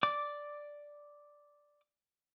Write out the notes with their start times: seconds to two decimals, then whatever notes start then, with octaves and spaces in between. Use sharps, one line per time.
0.03 D5 D6